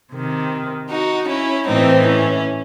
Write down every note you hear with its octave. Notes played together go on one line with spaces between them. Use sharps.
C3 D#3
D#4 F#4
C#4 E4
A2 E3 C4 D#4
C#4